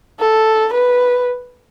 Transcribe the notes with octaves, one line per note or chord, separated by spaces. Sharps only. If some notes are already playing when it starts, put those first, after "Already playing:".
A4
B4